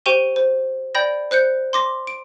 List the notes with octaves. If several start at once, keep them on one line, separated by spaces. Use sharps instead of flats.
G4 C5 G5 C#6 D#7 G7
C5
D5 G5 B5 G6 A#6
C5 F#6 G6 C#7
C6 D6 A#6
D7